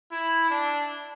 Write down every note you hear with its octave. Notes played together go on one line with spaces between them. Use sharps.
E4
D4